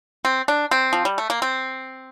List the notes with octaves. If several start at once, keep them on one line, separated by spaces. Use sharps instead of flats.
C4
D4
C4
F3
G3
A3
A#3
C4